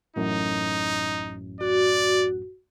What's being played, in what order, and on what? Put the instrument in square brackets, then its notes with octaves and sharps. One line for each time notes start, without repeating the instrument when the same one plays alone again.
[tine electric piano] A1 F#2 A2 [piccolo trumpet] D#4
[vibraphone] F#4 [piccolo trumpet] D5